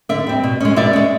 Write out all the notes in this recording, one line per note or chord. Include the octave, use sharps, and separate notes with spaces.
D3 D5 E5
G3 C4
B2
G#3 C#4
B2 D5 E5
G#3 C#4